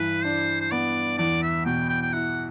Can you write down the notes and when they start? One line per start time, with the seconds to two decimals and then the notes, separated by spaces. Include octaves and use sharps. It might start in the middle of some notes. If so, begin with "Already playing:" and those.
Already playing: G2 E3 B4
0.24 D4 C5
0.60 C5
0.72 B3 D5
1.18 E2 D5
1.43 E5
1.66 B2 G5
1.89 G5
2.02 G5
2.13 E4 F#5